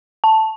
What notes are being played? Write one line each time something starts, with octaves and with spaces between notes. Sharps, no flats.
A5